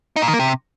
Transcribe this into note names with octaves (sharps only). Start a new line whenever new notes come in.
D#4
A#2
D#3
A#3
C3